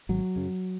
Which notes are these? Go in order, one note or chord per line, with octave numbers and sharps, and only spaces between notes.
G#1 F#3
F#2 C#3